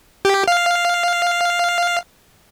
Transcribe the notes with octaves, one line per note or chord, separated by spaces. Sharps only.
G4
F5